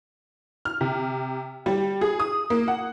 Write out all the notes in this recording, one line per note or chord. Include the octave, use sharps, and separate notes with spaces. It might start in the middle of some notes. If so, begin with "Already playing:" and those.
F6
C3
G3
G#4
D#6
A#3
F#5